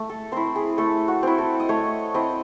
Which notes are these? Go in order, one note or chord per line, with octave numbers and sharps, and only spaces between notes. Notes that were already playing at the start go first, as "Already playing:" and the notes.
Already playing: A3
A4
C4 E4 C5
G#4
A3 A4
F#4
C4 E4
A4
D#5
A3 C#5
C4 E4 D#5